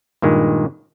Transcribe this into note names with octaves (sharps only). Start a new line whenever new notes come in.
G2 A#2 D#3 G#3